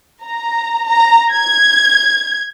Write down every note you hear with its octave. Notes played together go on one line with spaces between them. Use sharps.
A#5
A#5
G#6